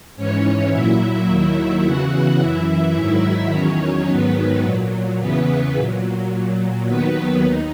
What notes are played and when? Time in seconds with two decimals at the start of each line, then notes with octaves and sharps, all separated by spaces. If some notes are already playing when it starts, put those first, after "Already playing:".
0.16 G#2 E3 C#4 C#5
0.71 A#2 F#3 E4 E5
1.27 D#2 D#3 F#3 E4 E5
1.84 E2 C#3 E3 F#4 F#5
2.39 F#2 E3 E4 E5
2.95 G#2 D#3 F#3 E4 E5
3.52 E2 D#3 F#3 C#4 C#5
4.08 G#2 D#3 F#3 B3 B4
4.63 A#2 F#3
5.20 E2 C#3 E3 B3 B4
5.75 A#2 F#3
6.31 A#2 F#3
6.87 D#2 D#3 F#3 B3 B4
7.43 D#2 D#4